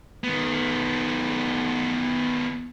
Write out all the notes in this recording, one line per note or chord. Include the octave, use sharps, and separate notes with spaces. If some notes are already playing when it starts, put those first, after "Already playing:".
D#3 B3